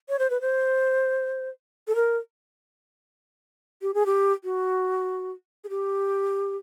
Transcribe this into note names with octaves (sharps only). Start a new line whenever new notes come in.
C#5
C5
B4
C5
A4
A#4
G4
G#4
G4
F#4
G#4
G4